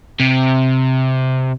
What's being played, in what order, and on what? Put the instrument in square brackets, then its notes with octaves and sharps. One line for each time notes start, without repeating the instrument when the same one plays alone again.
[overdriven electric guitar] C3